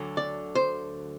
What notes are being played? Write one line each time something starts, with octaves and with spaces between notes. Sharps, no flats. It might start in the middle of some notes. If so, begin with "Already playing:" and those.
Already playing: D2 D3 F#3
D5
C5